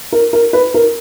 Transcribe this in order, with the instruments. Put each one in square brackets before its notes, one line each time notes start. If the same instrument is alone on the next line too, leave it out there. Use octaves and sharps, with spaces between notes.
[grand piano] A#4
A#4
B4
A#4